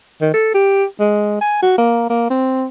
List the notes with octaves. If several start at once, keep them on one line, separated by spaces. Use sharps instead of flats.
D#3
A4
G4
G#3
G#5
F#4
A#3
A#3
C4